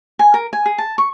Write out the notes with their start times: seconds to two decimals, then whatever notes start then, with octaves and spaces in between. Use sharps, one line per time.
0.19 G#5
0.34 A#4
0.53 G#5
0.66 G#4
0.78 A5
0.98 C#6